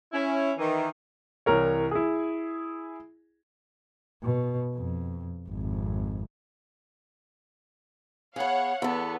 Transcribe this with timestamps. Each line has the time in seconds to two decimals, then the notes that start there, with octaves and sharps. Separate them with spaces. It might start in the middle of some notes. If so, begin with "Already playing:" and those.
0.13 C#4 E4
0.58 D#3 E3
1.46 C2 E3 A#4 C#5
1.91 E4 G#4
4.23 B2
4.75 F2
5.49 G#1 F2
8.36 B3 G#4 C#5 F5 F#5
8.82 E2 B3 A4